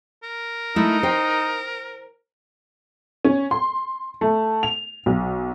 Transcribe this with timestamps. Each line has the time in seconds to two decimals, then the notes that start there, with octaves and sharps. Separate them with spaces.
0.23 A#4
0.76 A3 D#4 E4
1.03 C5 G5
3.25 C#4
3.51 C6
4.21 A3
4.63 F7
5.06 B1